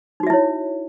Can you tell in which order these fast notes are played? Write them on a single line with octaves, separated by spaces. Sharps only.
D#4 F#4 E5 E4 C#5